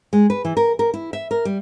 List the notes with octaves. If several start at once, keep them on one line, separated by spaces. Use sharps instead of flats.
G#3
B4
E3
A#4
A#4
E4
E5
A#4
G3